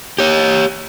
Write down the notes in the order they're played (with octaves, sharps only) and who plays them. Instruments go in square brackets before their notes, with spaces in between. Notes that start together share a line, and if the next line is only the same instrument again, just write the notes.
[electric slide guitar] G4 C#5